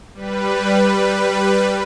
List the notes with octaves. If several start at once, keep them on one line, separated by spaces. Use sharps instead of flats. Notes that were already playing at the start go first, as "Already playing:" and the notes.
G3 B4